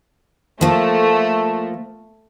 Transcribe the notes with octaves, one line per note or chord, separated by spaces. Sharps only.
F3 A3 A#3